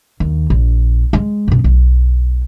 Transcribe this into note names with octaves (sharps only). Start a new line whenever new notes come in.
D#2
A#1
G#3
F#2 B2
B1